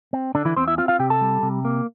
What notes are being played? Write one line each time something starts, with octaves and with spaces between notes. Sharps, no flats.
C4
D3 D4
E3 E4
E2 C4 C5
E4 E5
C4 F4 F5
F4 F5
C3 G4 G5
A4 A5
G3
C3
A#3